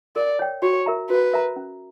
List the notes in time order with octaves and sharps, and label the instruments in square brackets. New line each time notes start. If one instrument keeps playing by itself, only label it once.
[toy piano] A#4 [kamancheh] D5
[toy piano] C#5 G5
[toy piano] F#4 [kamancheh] C#5
[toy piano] A#4 E5 A#5
[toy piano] F#4 [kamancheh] B4
[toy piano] A#4 E5 A#5
C#4